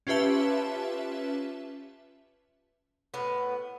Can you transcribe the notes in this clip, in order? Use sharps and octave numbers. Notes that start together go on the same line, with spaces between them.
C#4 F4 G4 B4 E5 A5
A2 B3 B4